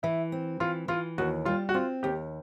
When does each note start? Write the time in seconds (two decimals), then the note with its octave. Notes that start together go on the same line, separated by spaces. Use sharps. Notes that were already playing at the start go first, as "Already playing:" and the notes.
0.03 E3 E4
0.32 C4
0.60 E3 F4
0.88 E3 F4
1.18 D#2 F#4
1.45 G3 F4
1.69 F#4
1.74 C4 F4
2.03 D#2 G4